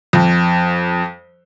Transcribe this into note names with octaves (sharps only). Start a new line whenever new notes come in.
F2